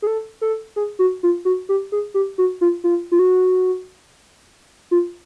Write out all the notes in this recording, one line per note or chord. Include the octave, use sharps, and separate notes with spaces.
G#4
A4
A4
G#4
F#4
F4
F#4
G4
G#4
G4
F#4
F4
F4
F4
F#4
F4